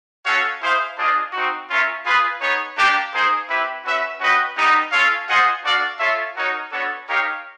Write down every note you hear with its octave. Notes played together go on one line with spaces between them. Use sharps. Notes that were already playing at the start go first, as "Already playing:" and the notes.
C#4 F#4 A4 C#5 F5
E4 G#4 C5 F5
D4 F4 G#4 C5 D#5
C4 D#4 F#4
C#4 F4 A#4 C#5 E5
F4 G#4 B4
B3 D#4 G#4 C#5
A#3 D4 G4
A#3 D#4 G#4 C5
C4 E4 G4 B4 E5
C#4 F#4 B4 E5
C#4 F#4 B4 D#5 G5
G3 B3 D#4
C#4 F4 A4 C#5 F5
F4 G#4 C5 D#5 F#5
D4 F#4 A4 D5 F5
F4 A4 C#5 E5
D#4 F#4 A#4 C#5
B3 D4 F#4 A4 C#5
D#4 G4 A#4 C#5 F5